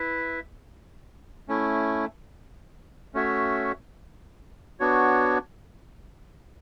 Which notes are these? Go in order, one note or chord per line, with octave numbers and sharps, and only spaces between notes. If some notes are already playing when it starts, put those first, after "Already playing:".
Already playing: E4 B4 E5
A3 C#4 E4
A3 C#4 F#4 C#5 E5
B3 D4 F#4 C#5